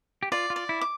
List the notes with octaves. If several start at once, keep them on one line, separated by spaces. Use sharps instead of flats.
G4
F4 D5
F4
D5
E4
D6